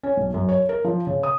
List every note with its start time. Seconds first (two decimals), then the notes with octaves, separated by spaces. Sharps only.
0.03 C#4
0.17 B1
0.34 F#2
0.49 C#5
0.69 A#4
0.84 F3
1.07 C#3
1.23 D#6